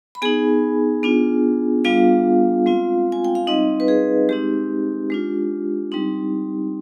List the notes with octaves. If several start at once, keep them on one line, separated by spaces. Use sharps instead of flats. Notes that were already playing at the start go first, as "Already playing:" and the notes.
B5
B3 D#4 G#4 G#5
B3 D4 F4
G3 B3 D4 F4 F5
G#3 C4 F4
G#5
G5
F5
G3 C4 D#4 D#5
B4
G#4
G#3 C4 D#4 G4
G#3 D4 F4
G3 C4 D#4